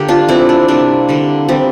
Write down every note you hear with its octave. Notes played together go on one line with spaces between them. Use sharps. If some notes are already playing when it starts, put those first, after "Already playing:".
Already playing: D3 A#3 G4
D4 F4
E3 A3 C4 E4
D4
C3 G3 A#3 D4
D3 G3 A#3
E3 G3 A#3 C4